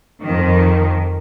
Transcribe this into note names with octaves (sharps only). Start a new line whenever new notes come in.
F2 D#3